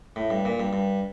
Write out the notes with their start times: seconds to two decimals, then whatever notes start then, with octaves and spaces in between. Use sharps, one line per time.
0.16 A2
0.30 G2
0.45 A#2
0.60 G2
0.73 G2